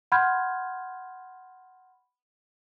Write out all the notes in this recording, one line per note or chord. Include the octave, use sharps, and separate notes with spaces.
F#5 B5 C6 F6 G6 G#6